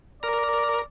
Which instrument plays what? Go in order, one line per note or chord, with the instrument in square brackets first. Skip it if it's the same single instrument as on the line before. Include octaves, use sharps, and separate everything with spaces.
[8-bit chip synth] A#4 A#5 [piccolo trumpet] D5